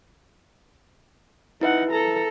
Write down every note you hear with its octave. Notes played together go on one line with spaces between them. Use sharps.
D#4 E4 B4 E5 F#5
A4 A#5